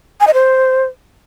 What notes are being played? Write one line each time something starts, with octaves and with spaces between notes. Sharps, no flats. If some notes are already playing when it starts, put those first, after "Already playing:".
G#5
D#5
C5